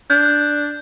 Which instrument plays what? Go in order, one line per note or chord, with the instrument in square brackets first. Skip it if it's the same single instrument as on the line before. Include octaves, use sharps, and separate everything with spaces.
[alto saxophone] D4 [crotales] G6